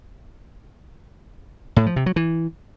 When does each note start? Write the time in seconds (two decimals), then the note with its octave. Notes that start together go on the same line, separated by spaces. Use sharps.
1.76 A2
1.86 F3
1.96 C3
2.06 F#3
2.16 E3